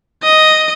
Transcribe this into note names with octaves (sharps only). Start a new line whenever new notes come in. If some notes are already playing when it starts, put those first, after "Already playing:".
D#5